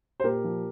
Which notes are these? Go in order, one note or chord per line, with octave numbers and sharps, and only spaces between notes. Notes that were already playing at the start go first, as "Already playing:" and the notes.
C5
A#2 G4 A#4
F3